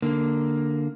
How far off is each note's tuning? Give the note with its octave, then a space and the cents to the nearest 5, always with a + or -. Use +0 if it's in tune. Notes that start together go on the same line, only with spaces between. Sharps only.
D3 +5 A#3 +0